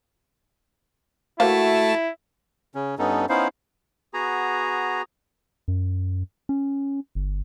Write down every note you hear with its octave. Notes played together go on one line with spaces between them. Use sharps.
A3 A#3 E4 F#4 C5 F5 A5
C#3 C#4
G2 B3 C#4 D#4 A4
B3 C#4 D#4 E4 C5 F5
B3 F#4 G#4 A#5
F#2
C#4
G1